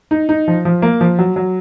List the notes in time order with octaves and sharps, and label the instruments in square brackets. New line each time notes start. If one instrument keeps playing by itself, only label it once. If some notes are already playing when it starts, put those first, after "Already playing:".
[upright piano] D#4
D#4
F3
F3
A#3
F3
F#3
F#3